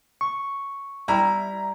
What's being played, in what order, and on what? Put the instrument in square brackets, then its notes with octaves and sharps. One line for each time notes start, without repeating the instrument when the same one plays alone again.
[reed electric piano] C#6
[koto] G3 E4 [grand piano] A#5